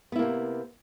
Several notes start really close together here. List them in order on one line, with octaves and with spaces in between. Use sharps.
B3 E4 A#3 C3